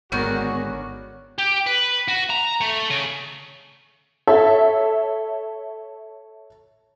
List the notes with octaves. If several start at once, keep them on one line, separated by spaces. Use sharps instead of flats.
G#1 D3 D#3 G#3 B3 C#4 F#4 A#4
G4
B4
F#4
A#5
A3
C#3
A4 C#5 E5